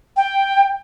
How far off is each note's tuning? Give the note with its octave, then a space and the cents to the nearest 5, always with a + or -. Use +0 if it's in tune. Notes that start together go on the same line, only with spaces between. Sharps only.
G5 +5